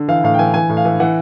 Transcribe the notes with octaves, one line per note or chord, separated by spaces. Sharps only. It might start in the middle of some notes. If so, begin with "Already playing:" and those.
Already playing: D3
E3 F5
A2 F5
G5
E3 G#5
E3 G#5
A2
F5
E3
E3 F#5